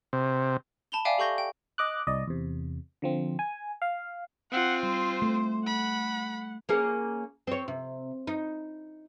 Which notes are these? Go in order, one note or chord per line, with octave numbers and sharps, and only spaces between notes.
C3
A5 B5 F7 G7
D5 E5 F5 G5 G#5 D6
G4 A4 C#6 G6 A#6 G7
G5
D#5 D6 F#6
C2 D5 D#5
E2 C3
D3 F3 C4
G#5
F5
C4 F4 F#5
G3 C5
A3
F#5 B5
A#3 C#4 G#4
C4 C#5
C3
D#4